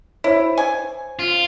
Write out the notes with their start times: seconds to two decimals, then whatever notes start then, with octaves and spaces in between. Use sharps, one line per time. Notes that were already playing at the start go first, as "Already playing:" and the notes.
0.24 E4 C5 C#5
0.58 G#5
1.19 F4